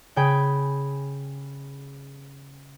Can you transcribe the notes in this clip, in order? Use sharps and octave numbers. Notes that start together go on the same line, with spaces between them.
C#3 G#4 G5 B5